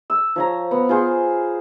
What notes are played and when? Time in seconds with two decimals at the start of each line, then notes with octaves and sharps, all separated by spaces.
0.10 E6
0.36 F3 C#5 A#5
0.71 B3
0.89 F4 G#4 C5